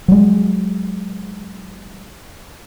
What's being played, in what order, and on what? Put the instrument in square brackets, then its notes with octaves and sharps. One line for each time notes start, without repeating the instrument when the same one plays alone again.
[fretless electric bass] F#3 G#3